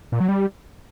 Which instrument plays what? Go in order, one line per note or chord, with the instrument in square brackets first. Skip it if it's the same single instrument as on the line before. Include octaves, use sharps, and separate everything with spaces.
[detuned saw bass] A#2
F#3
G3